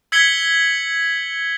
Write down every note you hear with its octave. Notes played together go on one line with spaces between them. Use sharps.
E6 G#6 B6 C#7 F#7 G7